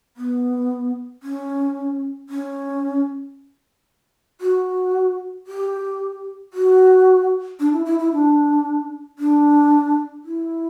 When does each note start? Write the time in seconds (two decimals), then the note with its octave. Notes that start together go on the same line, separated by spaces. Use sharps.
0.17 B3
1.23 C#4
2.29 C#4
4.41 F#4
5.47 G4
6.53 F#4
7.60 D4
7.73 E4
7.86 E4
7.99 E4
8.13 D4
9.19 D4
10.25 E4